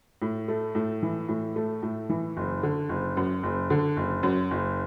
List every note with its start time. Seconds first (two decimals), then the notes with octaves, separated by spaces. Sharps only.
0.22 A2
0.48 A3
0.75 A2
1.03 E3
1.29 A2
1.56 A3
1.82 A2
2.09 E3
2.37 F#1
2.63 D3
2.89 F#1
3.17 F#2
3.43 F#1
3.70 D3
3.97 F#1
4.23 F#2
4.51 F#1